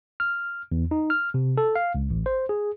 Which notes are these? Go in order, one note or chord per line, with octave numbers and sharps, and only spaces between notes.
F6
E2
D#4
F6
C3
A4
F5
C#2
A1
C5
G#4